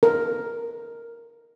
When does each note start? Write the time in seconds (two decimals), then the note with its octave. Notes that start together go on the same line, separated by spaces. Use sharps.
0.03 A#4